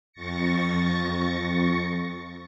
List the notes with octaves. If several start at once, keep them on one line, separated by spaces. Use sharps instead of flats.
F2 C#6 A6 A#6 C#7